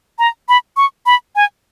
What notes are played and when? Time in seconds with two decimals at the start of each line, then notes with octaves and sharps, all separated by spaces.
0.19 A#5
0.49 B5
0.77 C#6
1.06 B5
1.36 G#5